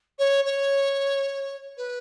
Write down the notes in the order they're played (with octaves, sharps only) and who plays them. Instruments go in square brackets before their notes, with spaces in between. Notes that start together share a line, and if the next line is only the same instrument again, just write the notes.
[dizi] C#5
C#5
B4